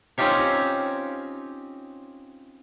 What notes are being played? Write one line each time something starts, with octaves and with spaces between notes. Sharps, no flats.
C4 C#4 D#4 F4 G4 C#5